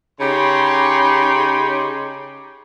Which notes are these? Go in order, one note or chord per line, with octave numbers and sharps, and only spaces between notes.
C#3 D#4 G4 C#5 B5 C6